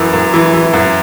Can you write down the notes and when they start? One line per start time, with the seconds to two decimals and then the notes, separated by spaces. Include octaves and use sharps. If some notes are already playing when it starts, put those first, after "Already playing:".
Already playing: F#2 E3
0.13 F#2
0.34 E3
0.54 E3
0.73 F#2